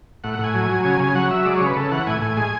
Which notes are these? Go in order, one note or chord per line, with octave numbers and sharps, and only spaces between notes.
A2 F#5
F#5
A2
G#5
F#3
F#3
C#3 G#5
C#3 G#5
F#3 F#5
F#3 E5
G#3 D5
C#3 C#5
B4
C#3 A4
E3 F#5
A2 G#5
A2 G#5
G#3 G#5